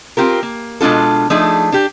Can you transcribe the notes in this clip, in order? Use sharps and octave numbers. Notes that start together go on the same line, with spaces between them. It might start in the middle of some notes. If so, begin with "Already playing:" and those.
C4 F4 G4 A#4
A#3
B2 G#3 D4 F4 A4
F3 A3 D4 D#4 G#4
D4 G4